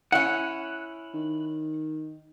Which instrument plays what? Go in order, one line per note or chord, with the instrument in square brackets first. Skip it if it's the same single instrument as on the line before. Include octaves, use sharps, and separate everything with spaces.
[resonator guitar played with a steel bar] C#4 E4 [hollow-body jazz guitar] F#5 [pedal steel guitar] F#6
[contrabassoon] D#3